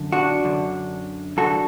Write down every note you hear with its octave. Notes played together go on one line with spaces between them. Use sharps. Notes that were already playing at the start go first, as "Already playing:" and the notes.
Already playing: F#2 D3
D4 F#4
F#2 D3
F#2 D3 F#4 A4